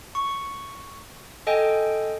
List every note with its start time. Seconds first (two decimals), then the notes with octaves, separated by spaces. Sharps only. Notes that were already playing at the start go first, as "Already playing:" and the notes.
0.15 C#6
1.47 A4 D#5 G5 G#5